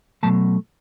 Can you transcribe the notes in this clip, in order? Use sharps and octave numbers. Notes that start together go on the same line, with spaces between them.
B2 F#3 A3 A5